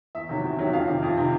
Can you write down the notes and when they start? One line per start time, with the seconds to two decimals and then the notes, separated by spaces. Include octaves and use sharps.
0.15 E2 E5
0.29 C3 D#3 F#3
0.43 E2
0.58 C3 D#3 F#3
0.66 E5
0.73 F2 F5
0.88 C3 D#3
1.03 F2
1.17 C3 D#3